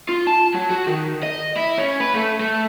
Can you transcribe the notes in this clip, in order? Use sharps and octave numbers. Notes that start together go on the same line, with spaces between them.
F4
A5
F#3
F#4
D#3
D#5
E4
C#4
B4
A3
A3